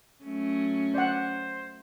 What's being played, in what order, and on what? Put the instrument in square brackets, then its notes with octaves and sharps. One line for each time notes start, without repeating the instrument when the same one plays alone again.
[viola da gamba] F#3 A3 C#4
[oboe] C5 [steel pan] D5 F#5